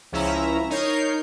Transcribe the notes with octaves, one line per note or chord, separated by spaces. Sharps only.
C#2 F3 C#4 E4 E5 A#5
D#4 A#4 C#5 G6 C7